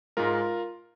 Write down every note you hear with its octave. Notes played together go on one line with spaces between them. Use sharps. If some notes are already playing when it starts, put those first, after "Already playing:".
G#2 G#3 F4 A#4